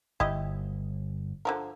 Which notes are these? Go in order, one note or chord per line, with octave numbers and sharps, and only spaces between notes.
G1 E4 G4 D#5
D3 F3 A#4